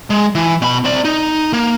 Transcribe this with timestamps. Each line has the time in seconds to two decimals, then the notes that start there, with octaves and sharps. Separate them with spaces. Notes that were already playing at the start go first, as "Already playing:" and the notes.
0.10 G#3
0.35 E3
0.62 B2 B5
0.84 C4 D5
1.05 D#4
1.53 A#3